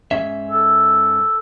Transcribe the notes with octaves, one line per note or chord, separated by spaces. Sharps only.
G#2 C#4 E5
A4